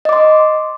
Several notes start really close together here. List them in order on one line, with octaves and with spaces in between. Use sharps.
D#5 D6 C6